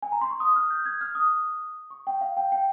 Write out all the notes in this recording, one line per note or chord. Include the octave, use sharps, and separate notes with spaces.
G#5
A#5
C6
C#6
D#6
F6
G6
G#6
F6
D#6
C#6
G5
F5
G5
G5